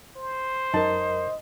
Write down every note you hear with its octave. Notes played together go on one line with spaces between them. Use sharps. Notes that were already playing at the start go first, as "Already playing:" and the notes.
C5
F#2 D#4 A#4 D#5 A5